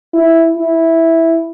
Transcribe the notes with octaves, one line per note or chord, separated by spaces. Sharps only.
E4
E4